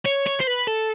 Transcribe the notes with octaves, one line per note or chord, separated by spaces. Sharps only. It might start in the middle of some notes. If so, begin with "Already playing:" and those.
C#5
C#5
C5
B4
A4